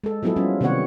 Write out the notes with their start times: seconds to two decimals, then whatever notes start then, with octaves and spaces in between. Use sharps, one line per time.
0.04 G#3 A4
0.23 F3 F#3 B3 E4 G#4 A4
0.36 G3 C#4 F4
0.61 C3 D#3 B3 G4 C#5 F#5